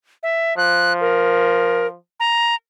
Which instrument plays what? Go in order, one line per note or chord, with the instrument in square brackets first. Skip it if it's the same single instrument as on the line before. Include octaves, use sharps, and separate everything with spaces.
[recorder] E5
[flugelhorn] F3 [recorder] F#6
[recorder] A#4
A#5